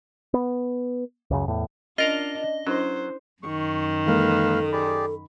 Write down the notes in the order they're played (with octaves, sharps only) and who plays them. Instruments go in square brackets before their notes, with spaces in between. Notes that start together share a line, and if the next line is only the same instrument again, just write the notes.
[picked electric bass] B3
C#2 F#2 C#3
E2 A2
[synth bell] C#4 [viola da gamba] D4 [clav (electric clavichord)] F4 A#4 F5 [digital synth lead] D#5
[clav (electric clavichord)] F#3 [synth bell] C#4 D4 E4 [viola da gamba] C5
[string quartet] F#2 D#3 [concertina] C#6
[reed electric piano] E3 G#3 A#3 [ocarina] A4 [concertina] B4 F5
[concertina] G4 G#4 D5 [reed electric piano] B5